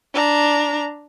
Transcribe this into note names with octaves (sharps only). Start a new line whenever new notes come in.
D4 A#5